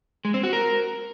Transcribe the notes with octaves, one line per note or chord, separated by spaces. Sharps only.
G#3
C4
F#4
A#4